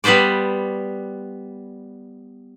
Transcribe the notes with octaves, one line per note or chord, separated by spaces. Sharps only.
G3 B3 B4 C5 D5